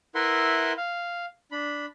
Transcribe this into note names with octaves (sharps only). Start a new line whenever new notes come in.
E4 A#4 B4 E5 F#5 C6
F5
D4 B5